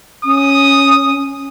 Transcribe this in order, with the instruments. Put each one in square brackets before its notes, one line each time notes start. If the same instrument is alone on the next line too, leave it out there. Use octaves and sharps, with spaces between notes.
[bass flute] C#4 [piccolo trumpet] D#6